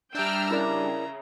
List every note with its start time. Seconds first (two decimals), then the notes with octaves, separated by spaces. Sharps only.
0.15 G3 D4 E5 G5 A#5 E6 F6
0.51 C#3 E4 A#4 D5